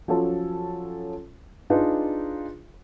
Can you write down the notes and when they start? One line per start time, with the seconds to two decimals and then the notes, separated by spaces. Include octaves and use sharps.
0.08 F3 F#3 C#4 F4 A4
1.70 D4 D#4 F4 G#4 B4